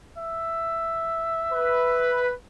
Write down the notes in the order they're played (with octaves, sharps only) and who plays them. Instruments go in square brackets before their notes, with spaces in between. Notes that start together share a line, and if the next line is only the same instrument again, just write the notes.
[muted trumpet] E5
[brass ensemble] B4